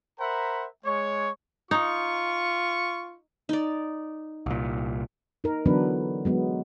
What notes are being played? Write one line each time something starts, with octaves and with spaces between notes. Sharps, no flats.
A#4 C5 E5 F#5 A#5 B5
G#3 C#5 C#6
D#4 F4 C#6
D#4 D5
C2 A#2
D#4 A#4
D3 E3 F#3 B3 D4 B4
F#3 G#3 B3